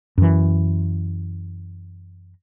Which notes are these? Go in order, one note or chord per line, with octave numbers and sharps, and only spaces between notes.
F#2 E3